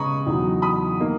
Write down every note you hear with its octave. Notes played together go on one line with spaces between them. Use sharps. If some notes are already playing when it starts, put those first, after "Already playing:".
Already playing: C#3 G#3 B3 A#5 B5 C#6 D#6
E2 D#3 F#3
B5 D#6
D#3 A#3